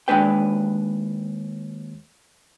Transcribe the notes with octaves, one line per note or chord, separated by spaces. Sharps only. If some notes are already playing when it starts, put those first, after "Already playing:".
D#2 G#2 G#3 D4 B4 G5